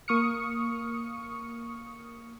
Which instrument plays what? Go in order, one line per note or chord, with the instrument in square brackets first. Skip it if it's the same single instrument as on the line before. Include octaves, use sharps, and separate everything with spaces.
[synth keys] A#3 C#6 D#6 F6 C#7